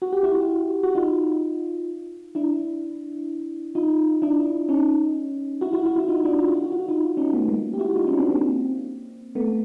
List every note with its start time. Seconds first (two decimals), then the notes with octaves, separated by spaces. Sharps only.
0.02 F#4
0.13 G4
0.23 E4 F#4
0.83 F#4
0.95 D#4 F4
2.35 D4 E4
3.75 D#4 F4
4.22 D4 E4
4.69 C#4 D#4
5.61 E4 F#4
5.73 E4 F#4
5.85 E4 F#4
5.96 E4 F#4
6.08 D#4 F4
6.24 D4 E4
6.39 F4
6.48 F#4
6.55 F4
6.64 F#4
6.72 F4
6.80 F#4
6.88 D#4 F4
7.17 C#4 D#4
7.33 A3 B3
7.48 G#3 A#3
7.74 G4
7.79 E4 F#4
7.96 D#4 F4
8.06 C#4 D#4
8.18 C4 D4
8.30 A#3 C4
9.35 A3 B3